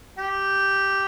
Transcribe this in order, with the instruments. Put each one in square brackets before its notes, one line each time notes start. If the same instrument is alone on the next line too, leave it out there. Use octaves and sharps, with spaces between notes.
[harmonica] G4